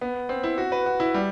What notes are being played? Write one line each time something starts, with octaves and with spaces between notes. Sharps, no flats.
B3
C4
E4
F#4
B4
F#4
E4
G3